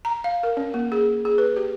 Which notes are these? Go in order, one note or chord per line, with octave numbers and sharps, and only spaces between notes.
A#5
F5
A#4
C#4
A#3
G#4
G#4
B4
G4